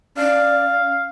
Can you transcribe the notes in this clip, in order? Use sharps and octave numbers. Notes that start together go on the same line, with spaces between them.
C#4 D5 F5